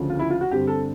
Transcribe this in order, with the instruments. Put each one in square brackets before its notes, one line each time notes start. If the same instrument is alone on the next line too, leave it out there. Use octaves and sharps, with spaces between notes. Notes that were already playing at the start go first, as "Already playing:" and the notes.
Already playing: [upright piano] D2 C#3 F3
F4
E4
F4
F#4
G2 D3 G3 C4 G4
A4